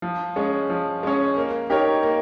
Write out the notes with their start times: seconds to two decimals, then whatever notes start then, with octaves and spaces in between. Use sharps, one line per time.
0.02 F3
0.36 G#3 C#4
0.70 F3
1.03 G#3 C#4
1.37 A#3
1.70 D#4 G4 A#4 C#5
2.03 A#3